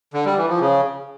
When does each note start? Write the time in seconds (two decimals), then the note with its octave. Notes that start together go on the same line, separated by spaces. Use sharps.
0.13 D3
0.25 G3
0.37 E3
0.49 F3
0.61 C#3